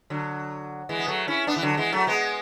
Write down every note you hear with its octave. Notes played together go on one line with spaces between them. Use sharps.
D3 F#3
E3 G#3
B3
F#3 A3
C#4 E4
B3 D4
E3
D3 F#3
E3 G#3
F#3 A3
G#3 B3